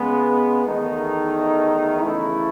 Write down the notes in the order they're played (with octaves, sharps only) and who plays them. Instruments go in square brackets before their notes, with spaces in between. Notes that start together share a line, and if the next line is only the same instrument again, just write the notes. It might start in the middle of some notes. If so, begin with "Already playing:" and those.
Already playing: [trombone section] C#3 G#3 B3
E2 D#3 A3 D#4
C#3 E3 A3 E4